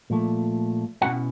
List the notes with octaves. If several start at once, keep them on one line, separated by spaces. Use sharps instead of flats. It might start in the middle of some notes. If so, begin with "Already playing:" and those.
A#2 F3 A3
B2 G#3 C#4 E4 F#4 F#5